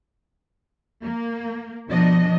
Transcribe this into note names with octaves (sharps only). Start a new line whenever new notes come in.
A#3
B2 F3 D4 D#5